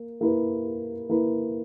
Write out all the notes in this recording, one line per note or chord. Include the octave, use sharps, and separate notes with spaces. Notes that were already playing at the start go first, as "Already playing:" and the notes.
Already playing: A#3
A#3 E4 B4
A#3 E4 B4